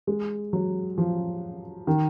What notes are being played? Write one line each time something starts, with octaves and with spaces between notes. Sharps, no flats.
G#3
F#3
F3
D#3